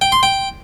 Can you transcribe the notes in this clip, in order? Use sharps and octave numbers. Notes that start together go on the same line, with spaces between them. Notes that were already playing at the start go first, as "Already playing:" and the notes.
G5
C6
G5